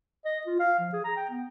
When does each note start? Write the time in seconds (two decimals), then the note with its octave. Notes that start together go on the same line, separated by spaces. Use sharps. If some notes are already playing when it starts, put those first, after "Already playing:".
0.25 D#5
0.47 F4
0.59 F5
0.79 F3
0.93 G#4
1.04 A#5
1.16 G5
1.30 B3